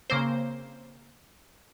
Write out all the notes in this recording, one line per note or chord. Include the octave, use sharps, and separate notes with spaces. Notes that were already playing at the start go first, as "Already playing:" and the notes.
C#3 A#3 C4 C5